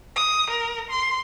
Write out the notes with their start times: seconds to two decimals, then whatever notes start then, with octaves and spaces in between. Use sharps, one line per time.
0.16 D#6
0.50 A#4
0.90 C6